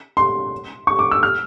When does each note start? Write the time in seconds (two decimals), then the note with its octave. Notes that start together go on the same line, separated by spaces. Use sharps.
0.17 C6
0.87 C#6
0.99 D6
1.11 E6
1.23 F6